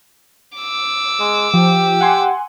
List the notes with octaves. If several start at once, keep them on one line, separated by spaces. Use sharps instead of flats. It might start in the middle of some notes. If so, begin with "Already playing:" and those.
D6 E6
G#3
F3 G4
F#5 G#5 C6